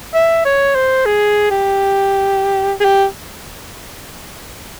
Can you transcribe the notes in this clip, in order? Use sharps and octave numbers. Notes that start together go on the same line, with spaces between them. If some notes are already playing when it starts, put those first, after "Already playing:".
E5
C#5
C5
G#4
G4
G#4
G4